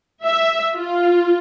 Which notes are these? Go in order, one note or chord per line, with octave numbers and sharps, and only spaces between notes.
E5
F4